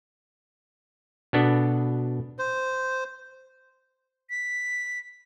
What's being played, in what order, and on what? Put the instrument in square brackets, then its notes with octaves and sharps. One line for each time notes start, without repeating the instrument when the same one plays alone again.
[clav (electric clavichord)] B2 B3 D4 A4
[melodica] C5
[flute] B6